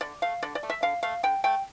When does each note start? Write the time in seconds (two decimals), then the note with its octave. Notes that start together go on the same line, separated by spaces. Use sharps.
0.01 D3 D5
0.22 A3 F5
0.42 D3 D5
0.55 D5
0.63 A3
0.70 E5
0.82 D3 F5
1.03 A3 F5
1.23 D3 G5
1.44 A3 G5